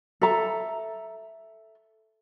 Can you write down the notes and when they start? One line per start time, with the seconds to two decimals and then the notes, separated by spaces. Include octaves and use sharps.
0.22 A4 E5 A#5